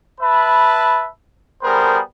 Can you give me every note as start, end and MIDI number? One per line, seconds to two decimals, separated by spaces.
0.21 1.08 71
0.21 1.08 76
0.21 1.08 81
0.21 1.08 83
1.63 2.00 55
1.63 2.00 59
1.63 2.00 68
1.63 2.00 70
1.63 2.00 72